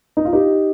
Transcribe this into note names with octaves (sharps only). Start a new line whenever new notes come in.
D#4
F4
D#4 G4